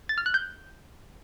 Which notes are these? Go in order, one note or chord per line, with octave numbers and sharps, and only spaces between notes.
A6
F6
F#6
G6